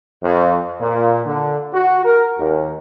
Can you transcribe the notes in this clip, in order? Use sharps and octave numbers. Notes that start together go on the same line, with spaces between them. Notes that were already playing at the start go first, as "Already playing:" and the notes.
F2
A#2
D3
F#4
A#4
D#2